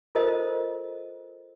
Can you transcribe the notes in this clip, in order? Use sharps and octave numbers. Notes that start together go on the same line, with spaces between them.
F4 A4 A#4 C5 D#5 A5